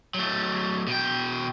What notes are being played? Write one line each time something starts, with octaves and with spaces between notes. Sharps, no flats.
F#3 A3
B2 G5